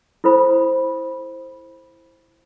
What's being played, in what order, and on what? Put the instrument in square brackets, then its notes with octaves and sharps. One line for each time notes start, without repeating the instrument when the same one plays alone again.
[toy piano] E4 A4 C5 B5